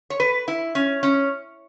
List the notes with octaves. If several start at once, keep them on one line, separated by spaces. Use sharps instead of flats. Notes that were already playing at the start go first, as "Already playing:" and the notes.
C#5
B4
E4
C#4
C#4